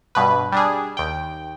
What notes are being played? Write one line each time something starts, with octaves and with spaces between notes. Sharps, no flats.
G2 B2 B4
G3 D4 G#4
D#2 G5